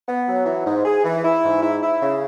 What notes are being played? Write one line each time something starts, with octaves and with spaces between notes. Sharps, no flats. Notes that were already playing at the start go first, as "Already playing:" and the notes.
B3
F#3
E3
G#2
G#4
E3
E4
G#2
E4
E4
C#3